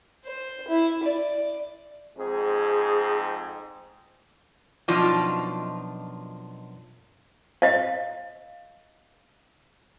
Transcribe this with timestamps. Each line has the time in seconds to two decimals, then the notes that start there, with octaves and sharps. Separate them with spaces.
0.25 C5
0.68 E4
1.03 D5
2.17 F2 G#2 C4 G#4
4.88 F#2 B2 F3 D4 D#4 F4
7.62 D#5 F5